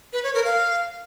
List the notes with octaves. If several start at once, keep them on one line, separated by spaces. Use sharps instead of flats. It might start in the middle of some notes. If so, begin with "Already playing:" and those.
B4
C#5
A#4
F5